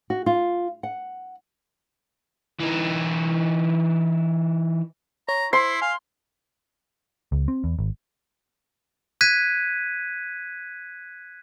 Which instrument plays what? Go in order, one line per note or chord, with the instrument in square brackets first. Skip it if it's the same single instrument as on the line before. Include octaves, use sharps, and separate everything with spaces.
[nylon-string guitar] F#4
F4
F#5
[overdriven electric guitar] E3 D#4
[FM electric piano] C#5 [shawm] A#5
[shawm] E4 [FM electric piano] C5 [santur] C6
[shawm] F5 [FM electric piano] G#5
[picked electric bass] C#2
C4
E2
G#1
[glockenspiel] F#6 G#6 B6 D#7